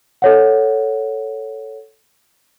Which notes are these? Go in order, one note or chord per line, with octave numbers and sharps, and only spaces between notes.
A4 C#5 F#5